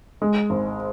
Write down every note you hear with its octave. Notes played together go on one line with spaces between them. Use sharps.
G#3
G#1